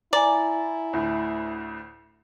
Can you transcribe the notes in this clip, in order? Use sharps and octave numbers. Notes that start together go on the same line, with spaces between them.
E4 D5 G#5 A#5
D2 A2